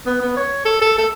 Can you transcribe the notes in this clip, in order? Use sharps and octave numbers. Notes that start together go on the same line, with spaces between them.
B3
B3
C#5
A4
A4
A4